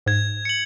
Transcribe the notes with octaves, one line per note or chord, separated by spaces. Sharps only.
G#2 G#6
C#7 F#7